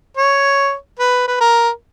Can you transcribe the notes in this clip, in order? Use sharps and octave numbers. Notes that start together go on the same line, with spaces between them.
C#5
B4
B4
A#4